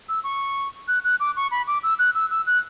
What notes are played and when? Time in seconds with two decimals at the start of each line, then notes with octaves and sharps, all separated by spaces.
0.09 E6
0.24 C#6
0.88 F#6
1.04 F#6
1.20 D6
1.36 C#6
1.51 B5
1.67 D6
1.83 E6
1.99 F#6
2.15 E6
2.30 E6
2.47 F#6